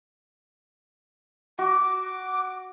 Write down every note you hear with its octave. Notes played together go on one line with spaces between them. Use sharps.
F#4 D6
D6